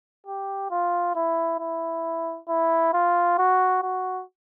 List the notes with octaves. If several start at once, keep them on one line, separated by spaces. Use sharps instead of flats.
G4
F4
E4
E4
E4
F4
F#4
F#4